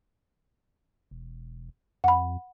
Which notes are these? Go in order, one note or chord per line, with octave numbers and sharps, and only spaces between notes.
E1
F2 F#5 B5